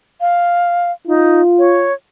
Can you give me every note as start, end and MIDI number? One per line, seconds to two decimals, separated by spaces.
0.21 0.92 77
1.07 1.41 63
1.07 1.89 65
1.59 1.93 73